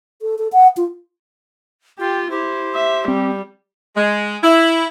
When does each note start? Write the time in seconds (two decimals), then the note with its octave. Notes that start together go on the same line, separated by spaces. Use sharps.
0.22 A4
0.38 A4
0.52 F#5
0.77 F4
1.99 F4 G4 G5
2.31 E4 G4 C5
2.75 E5
3.08 G3 C4
3.97 G#3
4.43 E4